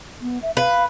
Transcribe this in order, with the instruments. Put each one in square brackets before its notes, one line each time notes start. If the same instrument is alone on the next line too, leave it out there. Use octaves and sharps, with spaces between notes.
[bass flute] B3
E5
[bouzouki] B4 [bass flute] F5